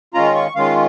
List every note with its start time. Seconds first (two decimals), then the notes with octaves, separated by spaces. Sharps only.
0.14 D#3 G#3 C#4 F4 A#5
0.35 C#6
0.55 D#3 G#3 C#4 F4 F5